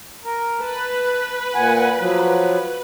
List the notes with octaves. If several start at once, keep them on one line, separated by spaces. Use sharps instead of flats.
A#4
B4 A5
A#2 F#5 G#5
F3 F#3